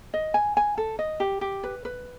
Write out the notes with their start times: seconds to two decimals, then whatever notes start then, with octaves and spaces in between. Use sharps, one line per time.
0.14 D#5
0.34 G#5
0.57 G#5
0.77 A4
0.99 D#5
1.20 G4
1.41 G4
1.63 B4
1.85 B4